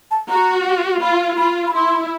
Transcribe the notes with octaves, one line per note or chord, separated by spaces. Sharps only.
A5
F#4 A#5
F4 B5
F4 B5
B5
E4 C6